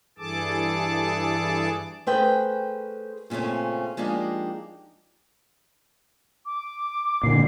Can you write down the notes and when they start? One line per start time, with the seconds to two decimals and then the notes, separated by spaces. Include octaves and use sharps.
0.18 G2 E3 G#4 A4 A5 D6
2.07 A3 C#4 G#4 B4 C5 G5
3.30 A#2 C#3 A3 C4 C#4
3.97 F3 G#3 A#3 D4 D#4 G4
6.46 D6
7.23 A#2 D3 C7